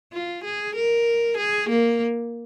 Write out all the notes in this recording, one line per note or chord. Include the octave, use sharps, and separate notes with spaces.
F4
G#4
A#4
G#4
A#3